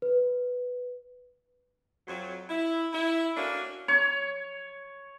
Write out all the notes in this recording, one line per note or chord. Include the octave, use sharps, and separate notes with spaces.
B4
F2 F#3
E4
E4
A3 A#3 C#4 D4 F#4
C#5